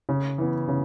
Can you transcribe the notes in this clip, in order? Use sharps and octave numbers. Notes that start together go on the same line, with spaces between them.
C#3
E3 B3
C#3